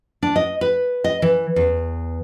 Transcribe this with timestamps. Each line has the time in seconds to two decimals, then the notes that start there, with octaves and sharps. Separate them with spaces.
0.22 D4
0.36 D#5
0.61 B4
1.04 D#5
1.22 E3
1.56 E2